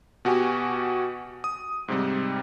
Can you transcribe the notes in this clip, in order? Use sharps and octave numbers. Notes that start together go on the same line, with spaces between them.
B2 F#4 G4 G#5
D#6
G#2 C3 G3